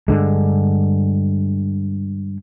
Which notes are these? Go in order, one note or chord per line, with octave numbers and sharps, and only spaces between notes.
G2 D3 G#3